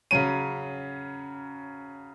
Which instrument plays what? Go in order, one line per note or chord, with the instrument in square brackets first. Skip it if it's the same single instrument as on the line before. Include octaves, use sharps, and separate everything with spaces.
[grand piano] C#3 F#3 C#4 D#7